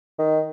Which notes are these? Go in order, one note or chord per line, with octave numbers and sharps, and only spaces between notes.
D#3